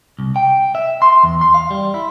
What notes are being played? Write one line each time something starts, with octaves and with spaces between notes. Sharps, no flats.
C2
G5
E5
C6
E2
C6
F5
G3
E4